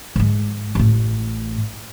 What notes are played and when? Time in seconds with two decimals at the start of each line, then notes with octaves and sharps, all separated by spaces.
0.16 G#2 G#3
0.75 A1 A2